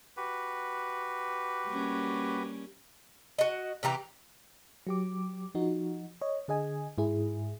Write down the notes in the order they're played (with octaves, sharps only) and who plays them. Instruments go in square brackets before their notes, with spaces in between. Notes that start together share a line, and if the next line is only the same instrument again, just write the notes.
[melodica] F#4 G4 B4
[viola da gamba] G3 A#3 C#4
[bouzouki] F#4 D#5
C3 E3 G4 A#5
[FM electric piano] F#3 G4 D6
F3 D#4 F#4
C#5 D#5
D3 G#4 D#5 G#5
G#2 E4 G#4